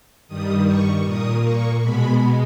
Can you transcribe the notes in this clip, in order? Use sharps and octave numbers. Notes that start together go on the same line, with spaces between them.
G2 D#3 G3 D#6
C#6
A#2 A#3 D#6
C#6
B2 G#3 B3 B5